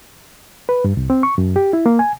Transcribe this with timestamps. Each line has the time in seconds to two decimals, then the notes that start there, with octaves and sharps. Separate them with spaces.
0.69 B4
0.84 G2
0.97 C2
1.10 C4
1.23 C#6
1.38 F#2
1.56 G4
1.73 E4
1.86 A#3
1.99 G#5